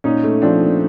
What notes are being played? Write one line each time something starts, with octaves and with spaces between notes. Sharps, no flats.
A#2 C#4 D#4
A3
F3 C4 D4
A#2